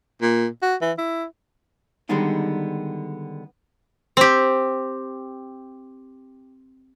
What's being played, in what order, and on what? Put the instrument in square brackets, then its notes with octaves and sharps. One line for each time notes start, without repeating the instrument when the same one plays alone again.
[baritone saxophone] A#2
F#4
E3
E4
[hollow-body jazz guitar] D3 D#3 G3 G#3 B3 D#4
[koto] C4 G4